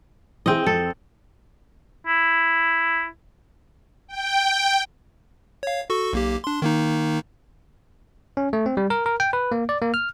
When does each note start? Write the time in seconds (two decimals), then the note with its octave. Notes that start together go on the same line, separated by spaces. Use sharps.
0.46 E3 C4 E4 G#4 D#5
0.66 F2 A4
2.07 E4
4.08 G5
5.63 C#5 F5
5.90 F#4 A4 C#6
6.13 B1 A#3 G4
6.44 D4 C6
6.62 D#3 A#3 D#4
8.37 C#4
8.53 A3
8.66 C4
8.77 G3
8.90 A#4
9.06 A#4
9.20 G5
9.33 B4
9.52 A#3
9.69 D5
9.82 A#3
9.94 F6